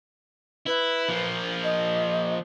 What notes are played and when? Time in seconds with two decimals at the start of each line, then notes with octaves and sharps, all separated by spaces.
0.67 E4 B4
1.09 F3 A#3
1.64 D#5